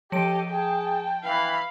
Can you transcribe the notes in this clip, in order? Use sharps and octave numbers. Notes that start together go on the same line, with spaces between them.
F3 G4 A4 C#5 D#5 D7
G#4 G5 A5
E3 F5 B5